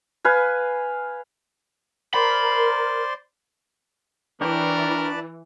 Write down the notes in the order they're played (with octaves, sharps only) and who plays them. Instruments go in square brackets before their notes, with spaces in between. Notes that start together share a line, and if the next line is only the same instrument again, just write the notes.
[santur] B4 F5 G#5
[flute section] A#4 [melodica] C5 D5 C6 [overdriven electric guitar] B5
[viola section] E3 [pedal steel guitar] D4 C#5 G5 [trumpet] A#4 [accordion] B4 D5 A5